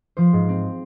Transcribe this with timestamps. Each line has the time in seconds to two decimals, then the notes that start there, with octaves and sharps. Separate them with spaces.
0.17 F3 C5
0.33 G#2
0.49 C4